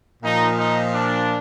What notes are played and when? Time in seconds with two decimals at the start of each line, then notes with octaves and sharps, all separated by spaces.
0.23 A#2 F3 D#4
0.58 D#4
0.93 D4